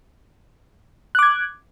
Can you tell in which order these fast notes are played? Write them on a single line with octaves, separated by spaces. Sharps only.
F#6 D6 G#6